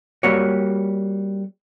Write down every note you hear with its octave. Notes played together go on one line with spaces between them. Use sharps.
G3 A#3 F#4 C#5